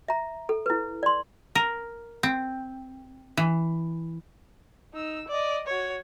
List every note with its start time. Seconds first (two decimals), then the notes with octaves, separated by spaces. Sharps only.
0.08 E5 A#5
0.49 A4
0.66 E4 B4
1.03 D5 C6
1.55 A#4
2.23 C4
3.37 E3
4.94 D#4 E6
5.28 D5 D#5
5.66 F#4 C#5